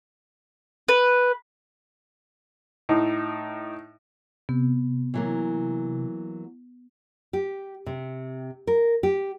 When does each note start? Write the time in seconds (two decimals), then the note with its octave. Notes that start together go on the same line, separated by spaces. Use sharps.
0.89 B4
2.89 A2 D#4
4.49 C3 B3
5.14 E3 F#3 A#3
7.33 G4
7.86 C3
8.67 A#4
9.03 G4